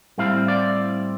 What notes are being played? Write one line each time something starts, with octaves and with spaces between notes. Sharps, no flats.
A2 G3 C4 E4 F5
D5